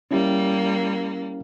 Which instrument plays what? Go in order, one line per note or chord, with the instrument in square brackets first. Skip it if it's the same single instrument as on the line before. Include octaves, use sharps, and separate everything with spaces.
[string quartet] G3 A#3 [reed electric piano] C#4 E4 G4